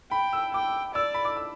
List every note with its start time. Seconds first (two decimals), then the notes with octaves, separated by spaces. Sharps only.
0.11 G5 B5
0.33 E6
0.54 G5 D6
0.95 D5 E6
1.14 B5
1.25 D6
1.37 E6